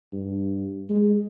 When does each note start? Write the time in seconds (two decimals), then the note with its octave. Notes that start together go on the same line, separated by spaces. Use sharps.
0.13 G2
0.89 G#3